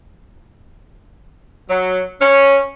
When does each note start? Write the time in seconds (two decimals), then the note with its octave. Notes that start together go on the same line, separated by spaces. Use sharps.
1.69 F#3
2.21 C#4